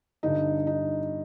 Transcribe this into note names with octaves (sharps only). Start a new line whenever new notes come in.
G1 G2 D3 D#4
D#4